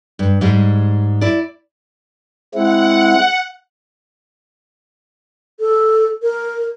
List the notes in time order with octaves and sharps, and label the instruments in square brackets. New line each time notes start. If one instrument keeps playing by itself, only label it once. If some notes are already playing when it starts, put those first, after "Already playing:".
[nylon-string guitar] G2
G#2 G3 G#3
E4 D5
[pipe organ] G#3 C4 E4 [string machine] F#5
[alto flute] A4
A#4